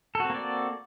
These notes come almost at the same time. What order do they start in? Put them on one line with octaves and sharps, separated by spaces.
A4 F#4 C4 A#3 D5